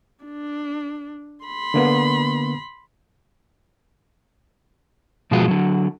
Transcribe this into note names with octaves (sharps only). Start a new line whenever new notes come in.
D4
B5 C6
D3 A#3 B3
B2 F3 G#3 F4 F#4
D3 F#3